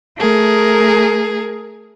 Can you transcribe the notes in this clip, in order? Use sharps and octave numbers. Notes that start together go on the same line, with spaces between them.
A3 G#4 A#4